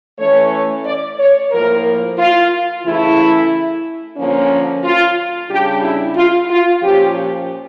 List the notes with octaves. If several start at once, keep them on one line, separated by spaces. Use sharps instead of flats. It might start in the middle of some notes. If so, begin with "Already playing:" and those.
E3 A3 C#4 C#5
D5
C#5
A2 F3 A#3 A#4
F4
C#3 E3 A3 E4
D3 F3 A#3 C#4
F4
C#3 G3 D4 G4
E4
F4
F4
A#2 F3 C#4 G4